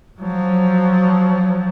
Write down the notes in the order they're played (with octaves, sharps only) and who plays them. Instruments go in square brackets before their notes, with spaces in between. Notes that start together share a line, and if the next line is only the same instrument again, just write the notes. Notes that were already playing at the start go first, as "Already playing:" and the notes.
[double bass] F3 F#3